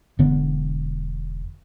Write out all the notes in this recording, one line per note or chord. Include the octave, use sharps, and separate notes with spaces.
E1 D3 B3